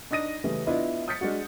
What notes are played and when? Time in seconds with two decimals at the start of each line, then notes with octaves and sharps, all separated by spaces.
0.11 D4 D#4 D#6 A#6 D#7
0.44 C#3 E3 G3 A3 C#4
0.67 B3 D4 E4 F4 D#5
1.08 D#6 F6 G6 A6 B6 C#7
1.21 G#3 D4 F#4